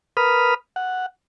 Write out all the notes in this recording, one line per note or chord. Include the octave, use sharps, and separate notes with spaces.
A#4 B4 B5 D#6 F6
F#5